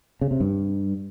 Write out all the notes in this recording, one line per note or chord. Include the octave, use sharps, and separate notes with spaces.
C#3
C3
G2